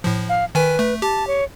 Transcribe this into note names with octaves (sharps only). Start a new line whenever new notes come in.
A2 F3
F5
D#3 B4 G#5
A3
G4 A5
C#5